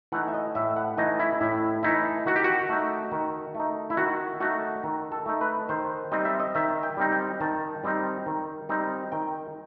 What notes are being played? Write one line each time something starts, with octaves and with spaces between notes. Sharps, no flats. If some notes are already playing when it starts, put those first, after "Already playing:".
E3 A3 D#4 F#5
E5
D#5
A2 E5
F#5
E3 A3 D#4 D#5
E4
A2 E4
E3 A3 D#4 E4
D#3 F#4
G4
F#4
A3 D#4
D#3
A3
D#4
E4
D#3 F#4
A3 D#4 F#4
D#3
A4
A3 D#4
B4
D#3 C5
G3 C4 D#4 D#5
E5
D#5
D#3 E5
G5
G3 C4 D#4
G5
D#3 A5
G3 C4 D#4
D#3
G3 C4 D#4
D#3 G5